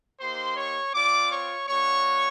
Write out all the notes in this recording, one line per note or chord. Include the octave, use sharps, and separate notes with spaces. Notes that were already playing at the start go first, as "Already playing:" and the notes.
A#3 D#4 G4 C5 C6
C#5 C#6
C4 F4 D5 D6
C#5 C#6
A#3 D4 F#4 C#5 C#6